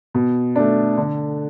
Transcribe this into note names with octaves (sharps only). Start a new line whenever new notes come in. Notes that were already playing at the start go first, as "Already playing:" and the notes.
B2
A3 D4
D3